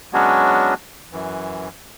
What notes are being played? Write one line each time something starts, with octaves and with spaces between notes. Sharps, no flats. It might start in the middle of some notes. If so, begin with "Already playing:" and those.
F#3 G#3 B3 C#4 D4 F#4
F#2 E3